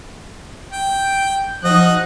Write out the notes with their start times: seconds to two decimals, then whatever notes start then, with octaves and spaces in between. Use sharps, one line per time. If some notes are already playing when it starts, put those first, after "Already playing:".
0.72 G5
1.64 F3 D#4 F#4 D#5 F#6